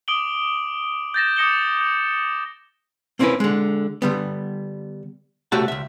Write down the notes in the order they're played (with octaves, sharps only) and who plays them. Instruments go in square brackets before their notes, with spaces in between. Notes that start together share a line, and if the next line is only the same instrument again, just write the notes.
[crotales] D6 D#6 D7 F#7 G7
G6 A6 A#6 E7
D6 D#6 A#6 C#7 E7 G7
G6
[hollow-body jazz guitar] A#3 C4 C#4 E4 A#4 B4
D3 G#3
D3 G3 B3
C3 A3 F#4 G4 C#5 A5
C#2 E5